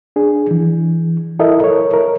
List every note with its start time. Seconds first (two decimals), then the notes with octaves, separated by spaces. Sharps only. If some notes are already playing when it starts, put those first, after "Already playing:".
0.16 D4 G#4
0.51 E3
1.39 E4 A4 A#4 D#5 E5
1.60 A#4 C#5
1.94 A#4